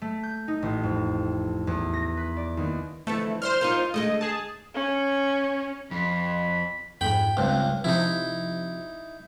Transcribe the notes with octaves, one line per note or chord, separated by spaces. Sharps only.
A3
G6
D#4
A1
F2
E2
A#6
B4
D5
D#2
F2 D3 E3 A3
G3 C5 C6 F6
D#4 F4 A#4
D3 G#3 A3 D#5
G#4 A5
C#4
F2 B5
F2 G#2 G5 B5
C#2 G2 C4
C3 F3 D#4 E4